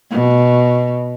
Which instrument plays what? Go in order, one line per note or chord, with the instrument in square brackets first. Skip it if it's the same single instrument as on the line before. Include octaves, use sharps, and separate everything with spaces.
[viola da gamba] B2